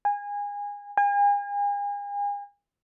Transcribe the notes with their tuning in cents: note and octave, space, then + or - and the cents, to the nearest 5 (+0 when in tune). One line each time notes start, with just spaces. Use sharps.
G#5 -25
G#5 -40